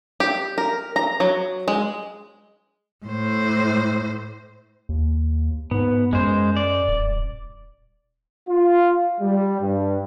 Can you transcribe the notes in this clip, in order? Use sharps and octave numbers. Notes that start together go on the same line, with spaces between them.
G4
A#4
A#5
F#3
G#3
A2 C5
D#2
G#2 B3
F#2 G#3 C5
D5
D#1
F4
G3
G2